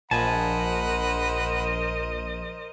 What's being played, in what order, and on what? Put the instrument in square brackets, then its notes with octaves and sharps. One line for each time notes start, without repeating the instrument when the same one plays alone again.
[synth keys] A#1 [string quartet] A#4 C5 D#5 [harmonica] F#5 B5 [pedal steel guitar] G#5 A5